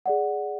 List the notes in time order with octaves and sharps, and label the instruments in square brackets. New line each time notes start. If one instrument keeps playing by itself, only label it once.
[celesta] G#4 D5 F#5